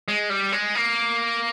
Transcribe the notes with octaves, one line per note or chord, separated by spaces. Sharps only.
G#3
G3
G#3
A#3